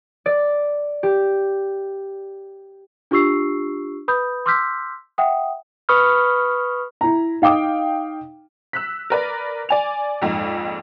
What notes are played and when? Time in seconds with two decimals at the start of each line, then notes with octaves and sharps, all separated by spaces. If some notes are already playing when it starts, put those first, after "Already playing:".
0.26 D5
1.03 G4
3.11 D4 F4 G4 C#6 E6 C7
4.08 B4 B5 D#6 G6
4.46 C6 D6 E6 F6 G6 B6
5.18 E5 F#5 G5 D#6
5.89 B4 B5 C#6 D#6 F6
7.01 E4 A#5
7.42 D#4 F5 G5 D6 D#6
8.73 E6 F#6 B6
9.10 A#4 B4 D5
9.69 D5 G#5 F7
10.22 A#1 F2 G#2